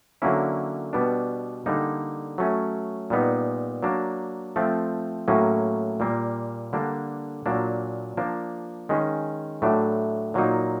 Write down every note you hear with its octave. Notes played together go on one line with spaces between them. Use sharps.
D3 F#3 A#3 C#4 E4
B2 G3 B3 D4
D3 G3 A#3 D#4
F#3 A3 C#4
A#2 G3 B3 D#4
F#3 A#3 D4
F3 A3 C4
A2 F#3 A#3 C#4
A#2 G3 A#3
D3 G3 A#3 D4
A#2 F#3 A#3 D4
F3 A#3 D4
D#3 G#3 C#4
A2 F#3 A3 D4
A#2 F#3 A#3 D#4